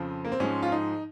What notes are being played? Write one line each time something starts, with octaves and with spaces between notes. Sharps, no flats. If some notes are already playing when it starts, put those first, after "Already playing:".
Already playing: F2 C#3 F3 C4
A#3
C4
G#2 F3 G#3 C#4
F4
D#4